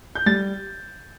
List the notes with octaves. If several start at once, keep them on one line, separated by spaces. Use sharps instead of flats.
G6
G3 A6